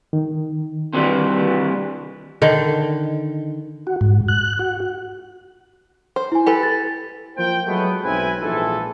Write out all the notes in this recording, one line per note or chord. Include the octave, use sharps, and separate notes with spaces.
D#3
C3 E3 G3
D3 D#3
F#4
G#2
F#6
F#4
C5
E4 G#5
G4 A4 B4
A6
F3 A#3 C5 G5
F#3 G#3 A3 B3
B1 G#2 C4 E4 B4 G#5
A#1 G#2 E3 F4 A4